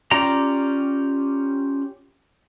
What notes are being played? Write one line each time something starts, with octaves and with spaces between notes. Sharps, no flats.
C#4 F4 G4 D5 A#5